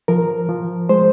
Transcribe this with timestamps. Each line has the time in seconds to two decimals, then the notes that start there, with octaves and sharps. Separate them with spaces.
0.08 F3 A#4
0.49 F3
0.89 G#3 C5